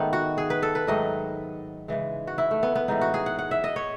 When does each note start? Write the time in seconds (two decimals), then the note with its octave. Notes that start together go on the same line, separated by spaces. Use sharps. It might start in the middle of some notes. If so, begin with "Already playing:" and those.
Already playing: G#2 D#3 A3 B3
0.13 F#4
0.38 G#4
0.50 B4
0.63 A4
0.75 B4
0.87 G#2 D#3 F#3 A3 D#5
1.88 C#3 E3 G#3
2.27 F#4
2.38 E4
2.51 A3
2.63 B3
2.75 B3
2.88 A2 E3 G#3 D#4
3.01 F#4
3.14 G#4
3.26 F#5
3.39 F#5
3.51 E5
3.64 D#5
3.76 C#5